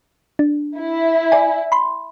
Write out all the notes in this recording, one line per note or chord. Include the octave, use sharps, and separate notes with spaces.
D4
E4
D5 G#5
B5 C6